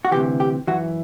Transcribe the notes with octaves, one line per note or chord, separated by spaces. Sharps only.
F#4
D2 C3 E3 G4
G4
F#2 E3 F#4